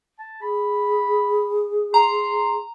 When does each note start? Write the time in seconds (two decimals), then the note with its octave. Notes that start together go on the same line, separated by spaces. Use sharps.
0.19 A5
0.42 G#4 B5
1.94 A#5 C6